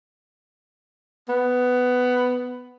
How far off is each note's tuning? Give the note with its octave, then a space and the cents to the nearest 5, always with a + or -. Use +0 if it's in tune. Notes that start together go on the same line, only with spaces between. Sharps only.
B3 +10